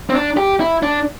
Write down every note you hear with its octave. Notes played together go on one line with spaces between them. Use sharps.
C4
D4
G4
E4
D4